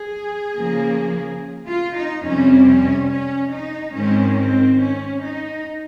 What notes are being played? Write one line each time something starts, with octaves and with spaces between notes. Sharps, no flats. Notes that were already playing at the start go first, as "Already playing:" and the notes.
Already playing: G#4
C#3 F3 A#3
F4
D#4
F2 C3 G3 C4 C#4
C#4
C#4
D#4
G#2 D#3 G#3 C4 C#4
C4
C#4
D#4